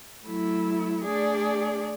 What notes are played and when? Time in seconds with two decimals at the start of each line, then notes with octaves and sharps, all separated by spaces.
0.25 F#3 A3 E4
1.04 A3 D4 G#4 D5